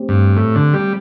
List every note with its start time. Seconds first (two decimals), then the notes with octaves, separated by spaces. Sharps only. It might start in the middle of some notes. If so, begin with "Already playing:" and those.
Already playing: A3 C4 G4
0.09 G2
0.36 A2
0.55 D3
0.73 G3